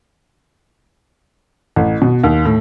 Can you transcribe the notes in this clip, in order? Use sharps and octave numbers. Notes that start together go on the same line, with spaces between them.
A1
B2
D#2
A2